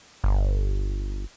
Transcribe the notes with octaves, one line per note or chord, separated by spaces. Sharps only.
G1